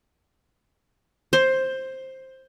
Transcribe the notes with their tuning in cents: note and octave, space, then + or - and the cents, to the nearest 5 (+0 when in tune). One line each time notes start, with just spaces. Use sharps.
C5 +10